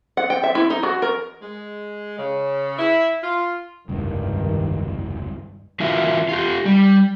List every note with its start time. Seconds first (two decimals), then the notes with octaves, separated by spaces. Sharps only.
0.17 F#5
0.30 G5
0.43 E5
0.55 E4
0.70 D#4
0.83 F#4
1.02 A#4
1.42 G#3
2.19 C#3
2.79 E4
3.23 F4
3.89 F1 C#2 G2 D#3
5.80 E3 F4 F#4 A#4 E5
6.29 F4 G4
6.66 G3